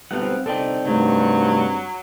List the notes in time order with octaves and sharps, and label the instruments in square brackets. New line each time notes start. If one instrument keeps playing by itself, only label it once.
[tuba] B1 [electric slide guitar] F#2 G3 B3 [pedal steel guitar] C4 F5 F#5
[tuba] C2 [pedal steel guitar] C4 D#4 [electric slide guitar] A4 D5 G5
[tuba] G2 [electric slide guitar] C3 D#3 A3 [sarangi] F#3